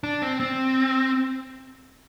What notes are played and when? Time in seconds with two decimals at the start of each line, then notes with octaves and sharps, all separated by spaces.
0.04 D4
0.22 C4
0.40 C4